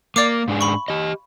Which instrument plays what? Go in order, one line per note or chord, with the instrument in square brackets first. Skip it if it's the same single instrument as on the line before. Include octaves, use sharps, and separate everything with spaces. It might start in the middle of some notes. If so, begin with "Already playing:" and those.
[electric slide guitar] A#3 [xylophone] D5 F5 D6
[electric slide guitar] G#2 D4 G#4
[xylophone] B5 C#6
[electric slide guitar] G4 D#5